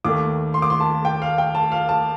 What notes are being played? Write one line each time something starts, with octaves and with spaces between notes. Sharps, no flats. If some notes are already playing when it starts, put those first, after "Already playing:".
D#2 D#3 A3 D6
C6
D6
C6
A5
G5
F5
G5
A5
F5
A5